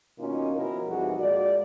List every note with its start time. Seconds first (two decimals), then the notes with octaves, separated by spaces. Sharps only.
0.18 B2 D#3 A#3 C#4 D#4 F4
0.56 B2 F3 E4 A#4
0.87 F2 E3 G3 D#4 F#4 G#4
1.18 A#2 G#3 F#4 D5